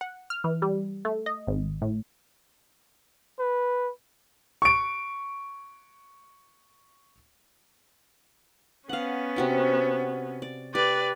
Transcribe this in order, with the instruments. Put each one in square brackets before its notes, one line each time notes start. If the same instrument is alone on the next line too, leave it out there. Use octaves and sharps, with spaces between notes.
[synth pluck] F#5
F6
E3
G3
A3
D#5
G#1
A2
[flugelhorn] B4
[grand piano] C#6 D7
[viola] B3 C#4 [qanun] F5 F#5
[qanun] C3 F#4 G5
D5
[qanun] G4 [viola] B4 D5